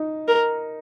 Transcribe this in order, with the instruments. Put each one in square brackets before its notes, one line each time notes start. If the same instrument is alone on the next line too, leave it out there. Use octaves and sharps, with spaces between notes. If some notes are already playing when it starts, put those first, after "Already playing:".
Already playing: [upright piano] D#4
[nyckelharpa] A#4